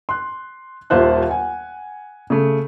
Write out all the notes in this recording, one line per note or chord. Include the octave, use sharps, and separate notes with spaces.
C6 F#6
D#1 D#2 F4 C5 E5 F#6
F#5 G#5
C#3 A3